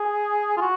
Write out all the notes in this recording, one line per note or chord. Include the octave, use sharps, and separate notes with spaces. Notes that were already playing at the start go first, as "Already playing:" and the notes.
Already playing: G#4
F4
F#4